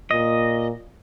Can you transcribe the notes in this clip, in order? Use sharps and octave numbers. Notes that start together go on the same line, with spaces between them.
A#2 D#5